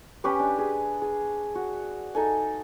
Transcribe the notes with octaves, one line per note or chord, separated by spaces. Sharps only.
C#4 G4 B4
D4
G#4
G#4
F#4
D#4 A4 G#5